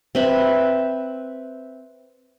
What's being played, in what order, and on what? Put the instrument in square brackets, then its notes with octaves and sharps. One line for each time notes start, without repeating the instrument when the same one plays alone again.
[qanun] C4 B4 E5